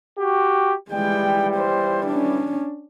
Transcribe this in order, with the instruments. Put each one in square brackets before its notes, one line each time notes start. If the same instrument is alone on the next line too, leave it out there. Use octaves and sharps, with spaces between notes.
[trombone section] F#4 G4
[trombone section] E3 G3 [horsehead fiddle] G#3 G5
[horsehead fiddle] C5
C#4 D4